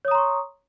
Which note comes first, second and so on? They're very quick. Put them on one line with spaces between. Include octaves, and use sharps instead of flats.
C#5 D#6 A#5 C6 C#6